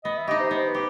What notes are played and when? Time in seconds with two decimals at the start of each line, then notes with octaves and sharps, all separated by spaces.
0.04 B3 D#5
0.16 E5
0.28 D#4 G4 D#5
0.40 C5
0.51 B3 C5
0.67 B4
0.75 G4